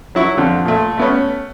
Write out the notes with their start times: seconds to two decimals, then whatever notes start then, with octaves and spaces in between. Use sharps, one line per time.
0.15 F#3 E4 C#6
0.37 F2 D3
0.65 A#2 A3
0.98 A3 B3 C#4